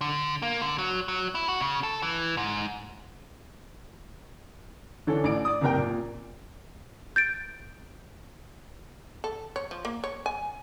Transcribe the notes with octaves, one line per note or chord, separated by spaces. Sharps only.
D3
A#3
D3
F#3
F#3
E4
F#4
C#3
A4
E3
G#2
D3 E3 C#4 D4 A4
A1 D5 D7
D5 D#6
F#1 C3 A#4 G5
A#2
G6 A6 D7
A4
C#5
F3
A#3
C#5
G#5